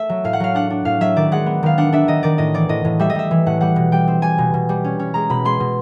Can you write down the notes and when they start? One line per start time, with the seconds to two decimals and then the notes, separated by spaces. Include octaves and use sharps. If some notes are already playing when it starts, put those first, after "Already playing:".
Already playing: A3 E5
0.09 F#3
0.24 A2 F5
0.33 F#5
0.40 F#3 F5
0.55 D4 F#5
0.70 D4
0.85 A2 F5
1.01 F#3 E5
1.16 D#3 D5
1.32 G#3 F#5
1.46 B3
1.63 D#3 F5
1.78 D4 F#5
1.92 D4 E5
2.08 D#3 D#5
2.23 D#3 D5
2.38 A2 D#5
2.54 E3 D5
2.69 A2 D#5
2.85 A2
2.99 G3 E5
3.10 D#5
3.15 G3 E5
3.31 E3
3.46 A2 F#5
3.61 G3 F#5
3.76 B2
3.92 G3 G5
4.08 C4
4.22 G3 G#5
4.38 B2
4.54 B2
4.69 G3
4.84 C#4
4.99 C#4
5.14 G#3 A#5
5.30 B2 B5
5.45 G#3 C6
5.60 B2